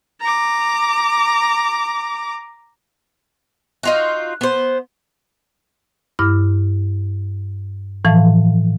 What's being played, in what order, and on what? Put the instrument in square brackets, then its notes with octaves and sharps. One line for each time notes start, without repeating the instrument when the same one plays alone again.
[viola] A#5 D6
[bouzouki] D#4 F4 F#4
B3 C5
[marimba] G2 E4 D6 F6
A2 E3 F3 F5 A5